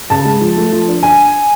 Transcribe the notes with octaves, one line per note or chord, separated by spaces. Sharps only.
C#3 A5
G#3
F3
A3
F3
D4
G#5